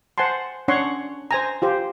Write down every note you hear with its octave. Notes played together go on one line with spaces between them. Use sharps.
C5 F#5 G#5 A5 C6
C#4 D4 C#5 F#5 C6 C#6
C5 G#5 A#5
F4 G4 C5